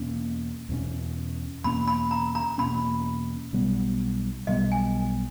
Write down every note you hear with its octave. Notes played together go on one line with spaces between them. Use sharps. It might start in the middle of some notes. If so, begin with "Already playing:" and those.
Already playing: E2 B2 A#3 C#4
E2 B2 A#3 C#4
E2 B2 A#3 C#4 B5
B5
A#5
A#5
E2 B2 A#3 C#4 B5
B1 B2 G3 B3
B1 B2 G3 B3 D#5
G#5